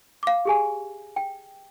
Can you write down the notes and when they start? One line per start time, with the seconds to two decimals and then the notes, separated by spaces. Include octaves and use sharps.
0.23 F5 D6
0.45 G4 G#4 G#5
1.16 G5